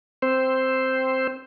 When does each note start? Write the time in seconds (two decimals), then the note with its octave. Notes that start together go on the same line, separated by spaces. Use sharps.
0.22 C4 C5